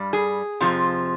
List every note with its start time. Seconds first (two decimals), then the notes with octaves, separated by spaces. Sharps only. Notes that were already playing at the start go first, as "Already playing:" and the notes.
Already playing: G2 G3
0.13 G#4
0.60 F2 C3 F3